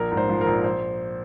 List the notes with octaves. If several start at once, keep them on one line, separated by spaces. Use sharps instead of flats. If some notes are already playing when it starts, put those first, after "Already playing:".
Already playing: A#1 A#4
G#2
C5
F3
A#4
A#1
C5